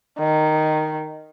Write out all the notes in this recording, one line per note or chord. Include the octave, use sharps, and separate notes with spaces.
D#3